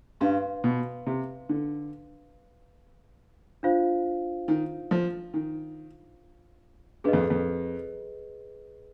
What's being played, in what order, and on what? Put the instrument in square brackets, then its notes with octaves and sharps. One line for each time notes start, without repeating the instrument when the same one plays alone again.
[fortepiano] G2 [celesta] B4 F5 C6
[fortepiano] B2
C3
D3
[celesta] D4 F4 C5 F5
[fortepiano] D#3
F3
D#3
[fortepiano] G2 [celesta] G#4 B4 D#5
[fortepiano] F2
F2